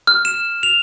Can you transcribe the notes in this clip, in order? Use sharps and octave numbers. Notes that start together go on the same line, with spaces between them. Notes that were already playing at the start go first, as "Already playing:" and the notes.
F6
E7
F7